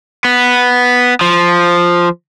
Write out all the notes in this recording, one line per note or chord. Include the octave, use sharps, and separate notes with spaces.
B3
F3